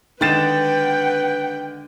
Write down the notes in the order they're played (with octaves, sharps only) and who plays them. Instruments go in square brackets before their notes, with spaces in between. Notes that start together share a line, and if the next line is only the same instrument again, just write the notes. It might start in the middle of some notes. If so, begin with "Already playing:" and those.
[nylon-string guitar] D3 G#3 [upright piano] D#3 A6 E7 [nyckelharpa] B4 [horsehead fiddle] F#5 G5